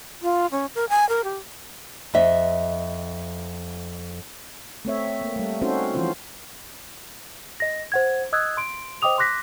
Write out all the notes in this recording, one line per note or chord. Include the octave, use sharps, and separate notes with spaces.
F4
C#4
A#4
G#5
A#4
G4
F2 D#5 E5
A3 C4 C#5 E5
A#3
G3 A3
C4 C#4 D#4 F#4 A4 C5
E3 F3 C#4 F4 C5
D#5 A#6
C5 F#5 G#6
D#5 D#6 E6 F#6 G#6
C6 D7
C5 D#5 G5 D6 D#6 F7
C6 D6 F#6 A#6 B6